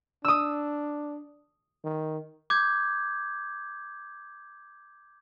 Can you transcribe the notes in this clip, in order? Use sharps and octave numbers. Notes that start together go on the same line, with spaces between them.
D4 D#6 E6
D#3
D6 G6 G#6